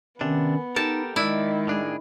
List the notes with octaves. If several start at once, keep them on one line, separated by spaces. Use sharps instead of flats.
C3 D#3 B3 C#4 D4
D#4 G4 A4 A#4 A5
D#3 G#3 E4 D5
A2 D4 G#4